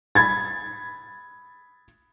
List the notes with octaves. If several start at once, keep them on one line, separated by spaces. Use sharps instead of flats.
B5 G#6 A6